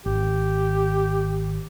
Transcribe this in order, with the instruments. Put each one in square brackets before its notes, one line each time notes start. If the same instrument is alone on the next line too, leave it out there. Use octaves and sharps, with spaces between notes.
[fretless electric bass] G#1 [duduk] G4